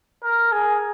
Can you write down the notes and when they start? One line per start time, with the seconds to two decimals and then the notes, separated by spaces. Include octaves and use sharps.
0.23 A#4
0.52 G#4